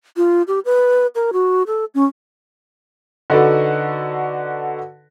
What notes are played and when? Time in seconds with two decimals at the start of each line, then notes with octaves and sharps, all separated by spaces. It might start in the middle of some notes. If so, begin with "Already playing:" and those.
0.17 F4
0.48 G4
0.65 B4
1.15 A#4
1.33 F#4
1.67 A4
1.95 C#4
3.30 D3 D#4 F#4 A4 B4 D5